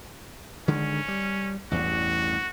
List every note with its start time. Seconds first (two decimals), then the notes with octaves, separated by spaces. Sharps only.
0.68 D3 D#3 G#3 C#4
1.08 G3
1.71 A1 E2 G2 F#4